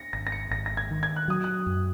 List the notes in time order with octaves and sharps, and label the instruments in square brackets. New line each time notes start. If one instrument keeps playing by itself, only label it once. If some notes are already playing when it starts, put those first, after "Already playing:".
Already playing: [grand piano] A#6 C#7
[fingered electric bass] G#1 [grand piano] A#6
[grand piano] A#6
C#7
[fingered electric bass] G#1 [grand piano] A#6
[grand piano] A#6
G#6
[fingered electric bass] D#3
[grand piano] G#6
F#6
[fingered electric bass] F#3 [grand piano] D#6
[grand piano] F#6
[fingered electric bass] F#2